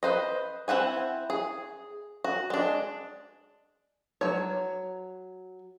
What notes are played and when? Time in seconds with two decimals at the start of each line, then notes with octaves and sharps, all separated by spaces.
0.03 B4 C5 D#5
0.68 C4 E4 F#5 G#5
1.30 G#4
2.24 F#4
2.50 G#3 D4
4.21 F#3 C#5